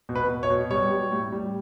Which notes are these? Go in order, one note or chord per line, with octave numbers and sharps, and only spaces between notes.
B2
B4
B2
C#5
B2
G3 C#5
G3
A2
G3